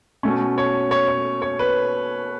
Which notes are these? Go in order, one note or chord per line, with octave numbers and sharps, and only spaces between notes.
B2 A3 C#4
C#5
C#5
C#5
C#5
B4